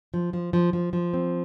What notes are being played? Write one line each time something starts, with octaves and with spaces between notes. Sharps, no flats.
F3
F3
F3
F3
F3
C4